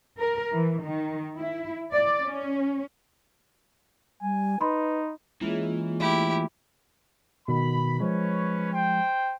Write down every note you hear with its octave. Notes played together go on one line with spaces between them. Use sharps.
A#4
E3
D#3
E4
D5
C#4
G3 G#5
D#4 B4 B5 C6
E3 G#3 A#3 C#4 E4 F4
A3 E4 G4
B2 D#3 B5
F3 G#3 C#4 B4 C#5
C5 G5